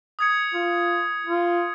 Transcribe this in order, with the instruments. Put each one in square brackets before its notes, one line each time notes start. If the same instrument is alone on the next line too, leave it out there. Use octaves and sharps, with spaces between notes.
[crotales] D#6 G#6 C#7
[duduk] F4
F4